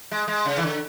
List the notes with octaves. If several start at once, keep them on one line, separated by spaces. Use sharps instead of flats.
G#3
G#3
C#3
E3
D3